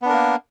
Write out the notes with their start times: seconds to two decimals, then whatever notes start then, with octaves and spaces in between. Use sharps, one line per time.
0.02 B3
0.06 D4
0.09 A#4
0.13 A#3